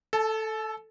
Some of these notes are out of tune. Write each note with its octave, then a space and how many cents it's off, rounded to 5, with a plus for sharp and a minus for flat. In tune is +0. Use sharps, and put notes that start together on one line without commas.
A4 +0 A5 -40